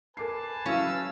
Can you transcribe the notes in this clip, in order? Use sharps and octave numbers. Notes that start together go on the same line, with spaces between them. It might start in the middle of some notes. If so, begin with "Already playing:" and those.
A#4 B4 G#5 A5 D6 C7
F#3 C#4 E4 F5 E6